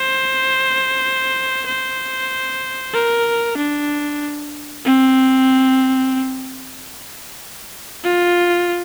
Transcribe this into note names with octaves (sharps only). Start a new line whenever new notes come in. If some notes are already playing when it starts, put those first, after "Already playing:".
Already playing: C5
C5
A#4
D4
C4
F4